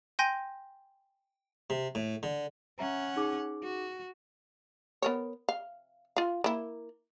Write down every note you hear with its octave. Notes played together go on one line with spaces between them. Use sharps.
G5 G#5 C6 G6 A#6 D#7
C3
A2
D3
C#4 E5 F#5 A#5
D#4 G#4 D6
F#4
B3 A#4 C#5
F5
F4 F5
A#3 E4